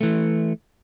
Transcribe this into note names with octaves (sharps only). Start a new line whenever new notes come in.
E3 A3